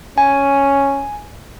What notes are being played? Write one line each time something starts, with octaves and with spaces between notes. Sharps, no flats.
C#4 G#5